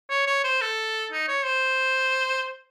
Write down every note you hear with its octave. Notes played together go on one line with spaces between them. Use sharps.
C#5
C#5
C5
A4
D#4
C#5
C5